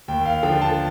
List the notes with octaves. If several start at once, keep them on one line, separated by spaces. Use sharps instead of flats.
D#2 G5
F5
D3 F3 G5
A5